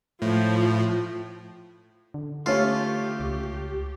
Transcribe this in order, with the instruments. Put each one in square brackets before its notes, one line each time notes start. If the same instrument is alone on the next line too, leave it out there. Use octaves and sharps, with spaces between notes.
[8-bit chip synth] A2 [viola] F3
[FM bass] D3
[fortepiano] A3 C#4 [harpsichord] F4 [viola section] G4
[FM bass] C#2